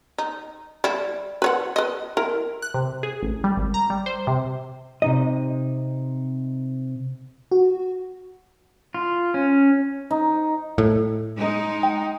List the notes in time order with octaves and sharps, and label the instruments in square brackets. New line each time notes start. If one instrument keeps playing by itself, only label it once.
[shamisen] D#4
G3 E4
B4 C#5 F#5
B4 D#5
E4 A#4
[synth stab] F#6
C3
G#4
A1
G3
G#1
A#5
G3
C5
C3
[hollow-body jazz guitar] C3 D#4 D#5
[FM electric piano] F#4
[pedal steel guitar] F4
C#4
[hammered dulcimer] D#4
[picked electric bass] A2
[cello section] G#3 D#4
[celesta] G5